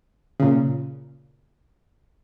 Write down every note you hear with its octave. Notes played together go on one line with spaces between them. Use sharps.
A#2 C#3